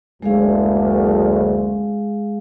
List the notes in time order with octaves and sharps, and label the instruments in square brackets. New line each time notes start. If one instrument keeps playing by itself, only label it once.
[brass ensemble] F#1 D2 [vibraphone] G#3 G#4 F5